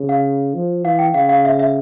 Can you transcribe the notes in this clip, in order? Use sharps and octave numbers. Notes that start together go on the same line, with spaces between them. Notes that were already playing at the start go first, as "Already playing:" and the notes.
Already playing: C#3
F5
F3
E3 F5
G5
C#3 F5
F5
E5
E5